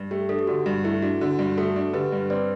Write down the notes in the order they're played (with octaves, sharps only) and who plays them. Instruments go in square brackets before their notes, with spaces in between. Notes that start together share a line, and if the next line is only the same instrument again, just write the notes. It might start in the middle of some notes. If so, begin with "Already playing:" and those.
Already playing: [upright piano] G2
[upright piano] A3 [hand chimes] G4
[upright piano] D4 [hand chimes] A4
[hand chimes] G4
[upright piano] D3 [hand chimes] F#4
[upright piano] G2
[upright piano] A3 [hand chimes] E4
[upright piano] D4 [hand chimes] F#4
[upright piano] D3 [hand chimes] F#4
[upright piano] G2 [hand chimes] F#4
[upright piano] A3 [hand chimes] F#4 A4
[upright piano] D4
[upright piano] D3 [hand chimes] G4 B4
[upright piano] G2
[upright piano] C4 [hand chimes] B4 D5